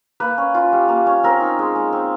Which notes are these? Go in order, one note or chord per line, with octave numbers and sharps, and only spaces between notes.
A#3 B4
C#4
F4
G3
A#3
C#4
C4 A#4
D#4
G#3
G#3
C4